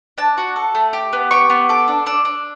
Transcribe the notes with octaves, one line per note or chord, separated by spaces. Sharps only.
D4 A5
F#4
A4
A3
G4
B3
G4 C#6
B3
A4 D6
D4
D4 E6
D4